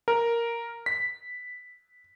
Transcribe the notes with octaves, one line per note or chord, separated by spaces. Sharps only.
A#4
B6